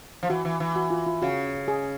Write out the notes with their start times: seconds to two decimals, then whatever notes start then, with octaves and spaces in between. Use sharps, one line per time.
0.23 F3
0.30 E3 F#4
0.45 E3
0.60 E3
0.76 F#4
0.91 F4
1.06 F4
1.22 C#3 F#4
1.68 G#4